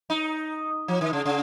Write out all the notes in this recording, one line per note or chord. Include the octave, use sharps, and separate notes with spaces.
D#4
F3
D#3
C#3
C#3